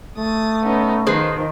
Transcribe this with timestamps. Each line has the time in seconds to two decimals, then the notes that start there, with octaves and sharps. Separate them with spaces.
0.18 A3 D#6 A6
0.62 B3 C#4 D#4
1.07 D#3 F3 G#4 B4 C5